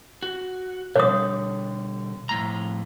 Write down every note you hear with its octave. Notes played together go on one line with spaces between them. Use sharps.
F#4
B2 D3 G3 C#5 D#6
F2 A2 A#5